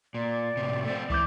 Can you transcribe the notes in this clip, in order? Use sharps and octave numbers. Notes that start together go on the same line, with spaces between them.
A#2 D5
A2 C3
A3 C4
C#2 E3 D6 G6